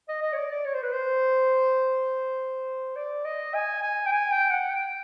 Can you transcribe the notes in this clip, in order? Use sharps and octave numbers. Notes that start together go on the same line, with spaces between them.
D#5
D#5
C#5
D5
D5
C#5
C5
B4
C5
D5
D#5
G#5
G#5
G5
G#5
G5
F#5
G5